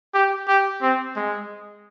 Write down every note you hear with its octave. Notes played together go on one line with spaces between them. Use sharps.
G4
G4
C4
G#3